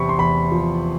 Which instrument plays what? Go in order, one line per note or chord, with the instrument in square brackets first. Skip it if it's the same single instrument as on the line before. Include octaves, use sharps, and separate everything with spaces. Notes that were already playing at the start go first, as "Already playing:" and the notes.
Already playing: [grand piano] E2 C3 B5 C#6
C6
E2 B5
F3